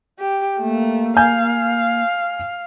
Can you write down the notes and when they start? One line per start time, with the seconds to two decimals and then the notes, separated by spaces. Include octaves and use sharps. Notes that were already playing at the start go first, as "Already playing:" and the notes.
0.19 G4
0.58 A3 A#3
1.17 F5 G#5 G6